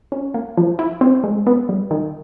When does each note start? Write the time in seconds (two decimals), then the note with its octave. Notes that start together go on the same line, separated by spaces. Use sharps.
0.12 C#4
0.34 A#3
0.57 F3
0.79 E4
1.01 C4
1.24 G#3
1.47 B3
1.69 G3
1.91 D#3